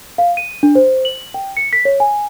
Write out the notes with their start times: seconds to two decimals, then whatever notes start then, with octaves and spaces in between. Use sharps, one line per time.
0.18 F5
0.37 D#7
0.63 D4
0.75 C5
1.05 F#7
1.34 G5
1.57 C#7
1.73 B6
1.85 C#5
2.00 G#5